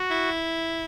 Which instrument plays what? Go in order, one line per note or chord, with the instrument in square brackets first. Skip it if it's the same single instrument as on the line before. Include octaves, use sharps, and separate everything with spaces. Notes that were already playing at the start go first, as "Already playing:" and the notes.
Already playing: [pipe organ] F#4
[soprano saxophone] E4